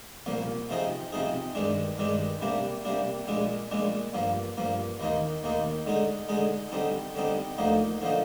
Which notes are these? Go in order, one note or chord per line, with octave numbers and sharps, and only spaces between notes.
C2 A#2 F3 A#3
C3 F3 C4 D#4 G#4
C3 F3 C4 D#4 G#4
G2 D#3 G#3 D4
G2 D#3 G#3 D4
C3 G3 A#3 D4
C3 G3 A#3 D4
A#1 A#2 G#3 D4
A#1 A#2 G#3 D4
G2 F3 A#3
G2 F3 A#3
D#2 D#3 A#3 D#4
D#2 D#3 A#3 D#4
D3 G#3 D#4 G#4
D3 G#3 D#4 G#4
D3 G3 C4 D#4
D3 G3 C4 D#4
D2 D3 F3 A#3 D#4
D3 F3 A#3 D#4